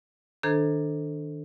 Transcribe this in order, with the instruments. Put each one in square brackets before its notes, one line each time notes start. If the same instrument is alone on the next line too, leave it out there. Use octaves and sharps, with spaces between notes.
[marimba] D#3 D4 A4 C5 A#5 G#6